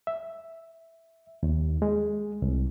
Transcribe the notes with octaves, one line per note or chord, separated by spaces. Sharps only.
E5
D#2
G#3
C2